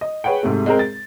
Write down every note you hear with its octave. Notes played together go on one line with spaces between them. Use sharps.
D#5
G#4 B4 C#5 F#5 G5
G#2 C3 A3
G#3 C4 A#4
A6